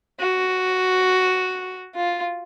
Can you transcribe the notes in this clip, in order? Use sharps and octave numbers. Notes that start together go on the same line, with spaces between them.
F#4
F4